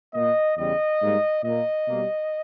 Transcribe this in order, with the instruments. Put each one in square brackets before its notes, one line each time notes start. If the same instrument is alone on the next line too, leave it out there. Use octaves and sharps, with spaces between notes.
[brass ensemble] A#2 A#3 D#5
E2 C#3 G3 D#5
G#2 G3 A#3
A#2 A#3 D#5
B2 G3 A#3